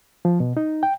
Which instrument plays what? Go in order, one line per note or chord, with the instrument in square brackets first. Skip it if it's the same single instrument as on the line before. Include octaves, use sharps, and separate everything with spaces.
[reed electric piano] F3
B2
D#4
G5